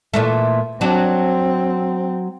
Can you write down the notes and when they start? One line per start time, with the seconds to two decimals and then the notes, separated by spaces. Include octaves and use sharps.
0.14 A#2 E3 A3
0.81 F#3 C4 D4